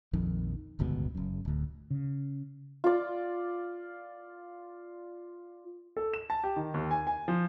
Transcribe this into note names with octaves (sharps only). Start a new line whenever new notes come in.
A#1 F2 D#3
D1 G1 C#2 B2
F#1 F#2
D1 D2
C#3
F4 D5
A4
E7
A5
G4
D#3
D#2
G#5
G#5
F3